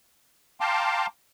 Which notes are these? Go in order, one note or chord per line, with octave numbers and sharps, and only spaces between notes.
F5 G5 A5 A#5 C6 D6